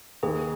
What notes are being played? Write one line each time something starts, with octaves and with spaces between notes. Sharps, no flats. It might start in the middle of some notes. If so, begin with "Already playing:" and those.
D#2 G#4